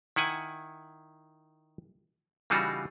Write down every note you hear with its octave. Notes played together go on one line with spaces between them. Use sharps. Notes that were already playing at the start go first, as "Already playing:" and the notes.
D#3 E4 F#5 G#5
C#3 E3 G3 D#4 F4 F#4